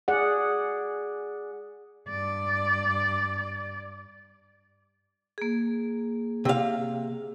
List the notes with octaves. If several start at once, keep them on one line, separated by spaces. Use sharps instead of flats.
G#4 D5 F#5
G2 D5
A#3 G#4
C3 F5